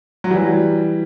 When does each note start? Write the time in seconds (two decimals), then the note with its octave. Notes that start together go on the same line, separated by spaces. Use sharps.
0.24 F#3
0.31 E3 G3